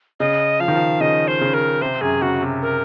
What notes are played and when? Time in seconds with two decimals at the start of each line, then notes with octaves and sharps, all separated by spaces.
0.20 C#3 D#5
0.60 F3 F5
0.68 D#3
0.75 F3
1.01 C#3 D#5
1.28 C5
1.41 C#3
1.54 A#4
1.81 C3 C5
2.01 F#2 G#4
2.22 C#3 F#4
2.42 C3
2.62 A#4